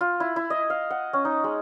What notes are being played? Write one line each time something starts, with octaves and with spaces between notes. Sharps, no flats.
F4
E4
E4
D#5
F5
F#5
C#4
D#4
G#3